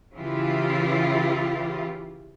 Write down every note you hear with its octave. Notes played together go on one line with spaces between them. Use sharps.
C#3 E3 E4 F4 G4